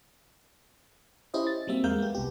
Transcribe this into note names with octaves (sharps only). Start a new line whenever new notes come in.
C#4 E4 G4 C5 D#5
A6
F#3 G3 A#3 C4 E5
E2 G#3 A#4 F5 G6
B3 G4
C2 G4